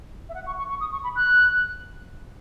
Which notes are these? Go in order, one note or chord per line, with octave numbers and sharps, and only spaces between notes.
E5
F#5
C#6
C#6
C#6
D#6
C#6
B5
F#6